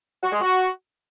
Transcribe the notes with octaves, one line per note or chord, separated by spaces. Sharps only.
F#4
G#3
F#4